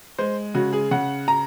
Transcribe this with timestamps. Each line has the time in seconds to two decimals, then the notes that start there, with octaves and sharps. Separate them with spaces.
0.18 G#3 C5
0.54 C#3 F#4
0.73 G#4
0.91 C#3 F#5
1.28 A#5